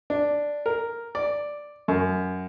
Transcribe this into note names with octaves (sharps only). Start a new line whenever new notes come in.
D4
A#4
D5
F#2